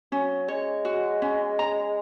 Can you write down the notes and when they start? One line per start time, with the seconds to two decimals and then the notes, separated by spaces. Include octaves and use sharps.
0.12 F#3 C#4
0.48 G#3 C#5
0.85 F#4
1.22 C#4
1.59 A#5